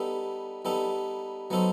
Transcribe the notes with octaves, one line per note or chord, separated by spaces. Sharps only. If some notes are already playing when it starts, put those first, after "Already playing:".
Already playing: G3 B3 D#4 A4
G3 B3 D#4 A4
F#3 B3 D#4 A4 C5